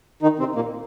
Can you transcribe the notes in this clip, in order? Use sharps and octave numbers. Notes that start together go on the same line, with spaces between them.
D#3 D#4
C3 C4
A#2 A#3